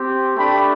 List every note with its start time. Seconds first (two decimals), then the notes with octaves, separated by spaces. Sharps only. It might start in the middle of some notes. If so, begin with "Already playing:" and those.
Already playing: C4 G4
0.36 A3 D4 G4 G5 B5